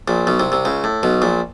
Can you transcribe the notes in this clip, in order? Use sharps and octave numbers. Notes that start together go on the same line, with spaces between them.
A#1 A#2
B1 B2
C2 C3
C2 C3
C#2 C#3
A2
B1 B2
A#1 A#2